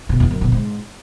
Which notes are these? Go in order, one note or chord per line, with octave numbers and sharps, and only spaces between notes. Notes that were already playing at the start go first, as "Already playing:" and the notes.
B2
E2
F#2
B2
G#2